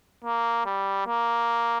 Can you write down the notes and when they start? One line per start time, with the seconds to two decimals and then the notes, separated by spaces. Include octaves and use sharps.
0.25 A#3
0.66 G3
1.07 A#3